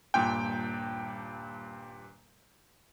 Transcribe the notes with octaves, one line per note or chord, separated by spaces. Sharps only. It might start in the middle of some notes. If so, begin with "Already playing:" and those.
D#1 G2 A#2 G5